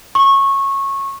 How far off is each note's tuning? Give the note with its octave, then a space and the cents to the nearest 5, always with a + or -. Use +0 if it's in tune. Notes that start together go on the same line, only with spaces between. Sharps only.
C#6 -15